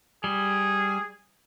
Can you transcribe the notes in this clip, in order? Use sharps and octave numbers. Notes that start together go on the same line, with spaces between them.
G3 G#4